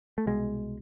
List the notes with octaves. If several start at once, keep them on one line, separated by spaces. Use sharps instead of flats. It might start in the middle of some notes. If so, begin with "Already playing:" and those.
A3
C2 B2 G#3